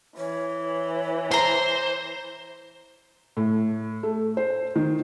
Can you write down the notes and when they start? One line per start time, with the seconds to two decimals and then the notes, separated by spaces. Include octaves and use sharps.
0.17 E3 C#5
1.31 C5 A#5 C6
3.37 A2
4.03 A3
4.37 C5
4.76 D#3